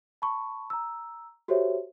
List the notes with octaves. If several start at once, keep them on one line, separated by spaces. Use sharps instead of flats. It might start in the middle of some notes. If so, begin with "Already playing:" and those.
A5 B5 C#6
A#5 E6
F#4 G4 A4 C5 C#5 E5